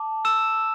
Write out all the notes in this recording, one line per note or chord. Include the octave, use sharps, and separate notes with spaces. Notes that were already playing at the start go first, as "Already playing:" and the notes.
Already playing: A5 D6
E6 E7